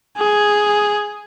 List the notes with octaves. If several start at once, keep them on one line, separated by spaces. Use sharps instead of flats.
G#4